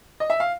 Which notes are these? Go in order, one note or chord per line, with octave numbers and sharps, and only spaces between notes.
D#5
E5
F5